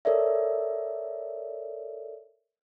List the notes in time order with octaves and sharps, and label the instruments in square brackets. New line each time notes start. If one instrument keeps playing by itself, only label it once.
[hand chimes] A4 A#4 C#5 D5 E5